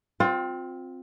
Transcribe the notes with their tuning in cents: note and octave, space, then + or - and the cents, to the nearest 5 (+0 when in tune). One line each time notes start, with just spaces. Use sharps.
C4 +0 F4 +30